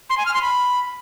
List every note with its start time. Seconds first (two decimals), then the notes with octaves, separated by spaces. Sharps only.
0.10 C6
0.18 G#5
0.26 F6
0.34 C6
0.42 B5